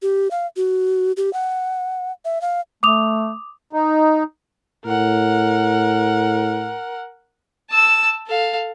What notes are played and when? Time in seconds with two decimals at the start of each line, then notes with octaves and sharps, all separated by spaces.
0.02 G4
0.31 F5
0.57 F#4
1.17 G4
1.33 F#5
2.25 E5
2.42 F5
2.83 A3 D6 D#6 F7
3.73 D#4
4.85 A2 A#4 F#5
7.70 A5 E6
8.27 A4 F5